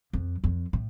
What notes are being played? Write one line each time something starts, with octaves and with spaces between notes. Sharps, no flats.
F2
F2
A2